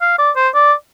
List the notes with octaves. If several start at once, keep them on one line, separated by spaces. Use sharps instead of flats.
F5
D5
C5
D5